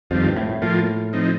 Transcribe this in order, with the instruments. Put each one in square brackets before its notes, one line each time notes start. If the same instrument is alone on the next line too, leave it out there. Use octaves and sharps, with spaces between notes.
[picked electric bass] F2 [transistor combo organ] D#3 G3 C4 F4
[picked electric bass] G2
A2
A2
[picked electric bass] A2 [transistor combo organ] F3 A#3 F4
[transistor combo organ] F3 C4 D#4